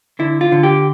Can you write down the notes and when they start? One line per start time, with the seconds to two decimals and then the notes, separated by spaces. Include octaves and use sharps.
0.19 D3 E4
0.41 F4
0.52 D3
0.63 G4